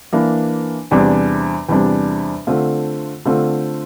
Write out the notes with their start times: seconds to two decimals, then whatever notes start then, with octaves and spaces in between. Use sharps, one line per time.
0.13 E3 A#3 D4
0.91 E2 C3 G3 D4
1.69 E2 C3 G3 D4
2.47 D3 A3 C4 F4
3.25 D3 A3 C4 F4